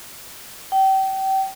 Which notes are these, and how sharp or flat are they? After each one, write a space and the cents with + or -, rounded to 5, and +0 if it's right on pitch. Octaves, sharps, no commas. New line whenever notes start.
G5 -30